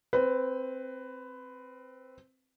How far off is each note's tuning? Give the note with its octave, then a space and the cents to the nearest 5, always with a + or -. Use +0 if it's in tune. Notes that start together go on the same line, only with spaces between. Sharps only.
C4 +0 B4 +15